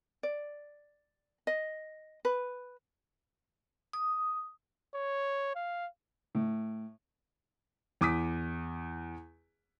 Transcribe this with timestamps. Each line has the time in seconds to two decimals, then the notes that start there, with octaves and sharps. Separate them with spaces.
0.23 D5
1.47 D#5
2.25 B4
3.93 D#6
4.94 C#5
5.55 F5
6.35 A2
8.01 E2 D6 D#6 B6